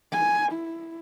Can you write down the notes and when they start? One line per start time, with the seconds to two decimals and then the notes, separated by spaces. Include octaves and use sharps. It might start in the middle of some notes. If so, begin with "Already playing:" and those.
0.12 G#5
0.52 E4